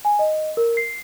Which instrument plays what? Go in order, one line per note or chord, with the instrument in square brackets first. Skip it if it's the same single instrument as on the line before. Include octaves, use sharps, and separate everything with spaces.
[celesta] G#5
D#5
A#4
C7